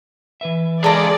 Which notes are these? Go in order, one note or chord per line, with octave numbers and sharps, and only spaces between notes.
E3 B4 E5
C#2 G#3 G#4 A4 D5 A#5